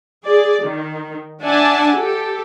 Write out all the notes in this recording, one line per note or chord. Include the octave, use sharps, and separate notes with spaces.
G#4 D5
D#3
D4 D5 E5 F#5 G#5 A5
G4 A4